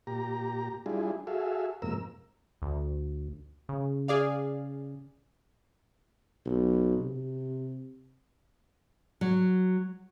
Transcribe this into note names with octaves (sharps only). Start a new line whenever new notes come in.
A#2 G4 A#5
G3 D4 E4 F4 G#4
F#4 G#4 A4 E5 F5
F2 G#2 C3 A#3 A#4 E6
D2
C#3
G#4 D5 F5
B1
C3
F#3